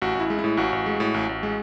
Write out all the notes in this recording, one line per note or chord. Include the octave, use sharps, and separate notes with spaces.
A1 F#4
A1 E4
G#3
E4
A2
A1 F#4
A1
G#3
A2
A1
A1
G#3